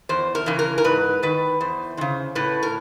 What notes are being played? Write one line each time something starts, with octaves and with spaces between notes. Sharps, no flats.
E2 C5
A#4
C#3 E3
A#4
A#4
G#2 B4
D#3 B4
E2 C5
C#3 E3 C5
A2 B4
A#4